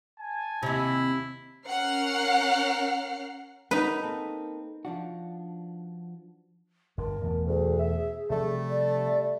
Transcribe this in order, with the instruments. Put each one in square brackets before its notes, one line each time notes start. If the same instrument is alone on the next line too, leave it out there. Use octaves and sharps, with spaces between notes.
[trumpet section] G#5 A5
[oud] D#2 C3 [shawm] E4
[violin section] C#4 A#4 F#5 F6 C7
[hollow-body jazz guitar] C4 C#4 F#4 [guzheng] D#4 B4
[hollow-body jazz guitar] A#3 C4 A4
F3 D4 F#4
[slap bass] G1 G2 D3 [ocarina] A#4
[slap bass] E2 B2 A3
[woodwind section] D2 [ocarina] G#4
[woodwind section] E5
[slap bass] C3 F3 [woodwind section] G3 A3
[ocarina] D5